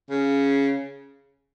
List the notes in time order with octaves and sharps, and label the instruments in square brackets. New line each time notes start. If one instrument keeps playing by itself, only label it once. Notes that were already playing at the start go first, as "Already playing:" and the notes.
[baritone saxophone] C#3